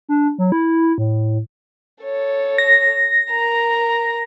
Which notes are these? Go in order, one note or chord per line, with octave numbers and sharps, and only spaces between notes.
D4
F#3
E4
A2
A4 C#5
A#6
A#4 A#5